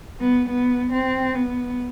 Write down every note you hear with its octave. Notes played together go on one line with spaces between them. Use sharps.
B3
B3
C4
B3